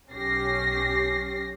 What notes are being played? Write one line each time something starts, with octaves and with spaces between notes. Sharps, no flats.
B1 C#4 G4 A#6 C7